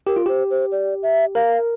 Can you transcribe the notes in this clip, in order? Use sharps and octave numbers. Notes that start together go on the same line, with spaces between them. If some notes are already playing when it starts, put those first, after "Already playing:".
G4 A#4
F4
G4 C5
C5
D5
E5
A#4 F5